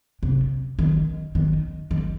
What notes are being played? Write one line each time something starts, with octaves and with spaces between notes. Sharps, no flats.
C3
D#3
D#3
D#3